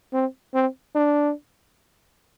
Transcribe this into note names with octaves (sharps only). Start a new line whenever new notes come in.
C4
C4
D4